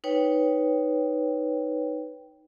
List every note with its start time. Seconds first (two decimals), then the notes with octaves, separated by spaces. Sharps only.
0.04 D#4 B4 C#5 G5